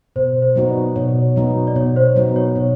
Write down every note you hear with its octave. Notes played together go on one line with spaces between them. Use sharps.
B2 C5
C5
F#3 B3 D#4 F#4
D5
B2 C#5
F#3 B3 D#4 F#4
D5
B2 C#5
C5
F#3 B3 D#4 F#4 C#5
C#5
B2